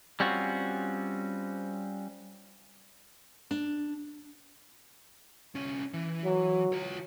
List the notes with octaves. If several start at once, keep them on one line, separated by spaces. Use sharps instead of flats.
G3 C4 C#4 F4 F#4
D4
C2 C#4
E3
F#3
F4 C#5